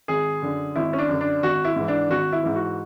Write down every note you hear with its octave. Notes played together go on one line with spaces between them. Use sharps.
G#1 G#4
F#2 D3
G#1 E4
C#4
D4
F#2 D3
D4
G#1 F#4
E4
G#2 E3
D4
G#1 F#4
E4
G#2 E3
F#4